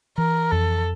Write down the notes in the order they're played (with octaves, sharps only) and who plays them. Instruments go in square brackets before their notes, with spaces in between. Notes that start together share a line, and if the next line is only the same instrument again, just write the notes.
[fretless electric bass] E3 [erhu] A#4
[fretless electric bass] F2 [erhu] A4